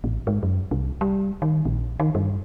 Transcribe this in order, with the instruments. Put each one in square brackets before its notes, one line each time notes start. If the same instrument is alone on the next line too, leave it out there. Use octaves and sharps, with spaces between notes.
[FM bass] A1
G#2
F#2
C2
G3
D#3
A#1
D#3
G2